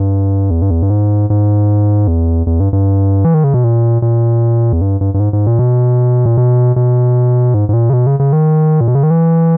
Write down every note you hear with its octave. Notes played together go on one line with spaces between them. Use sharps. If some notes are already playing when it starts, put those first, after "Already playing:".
Already playing: G2
E2
G2
E2
G2
G#2
G#2
E2
E2
G2
G2
E3
D#3
C#3
B2
A#2
A#2
E2
G2
G2
G2
G#2
G#2
A#2
B2
A#2
B2
B2
G#2
G#2
A#2
C#3
B2
C#3
C#3
D#3
A#2
B2
C#3
D#3
E3